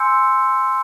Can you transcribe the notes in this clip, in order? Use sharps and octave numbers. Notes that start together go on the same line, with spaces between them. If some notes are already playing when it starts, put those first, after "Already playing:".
Already playing: G#5 C6 E6 G6 C#7